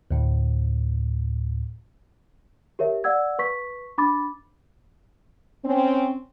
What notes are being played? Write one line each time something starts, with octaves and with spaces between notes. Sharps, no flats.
D2 A2
G4 A#4 C#5 E5
D5 F5 F#5 E6 G#6
B4 C#6 B6
D4 B5 D6 A6
C4 C#4